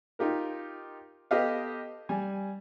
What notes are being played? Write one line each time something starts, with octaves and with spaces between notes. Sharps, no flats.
D#4 F4 G4 A#4
B3 G4 A4 D#5 F5
G3 G#5